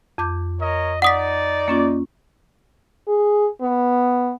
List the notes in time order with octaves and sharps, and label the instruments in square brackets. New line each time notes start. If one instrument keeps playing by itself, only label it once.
[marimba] F2 D6 G6
[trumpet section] A#4 C#5 D#5
[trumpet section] D#4 D5 [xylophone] F#5 D#6 B6
[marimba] A#3 C#4 F4
[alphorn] G#4
B3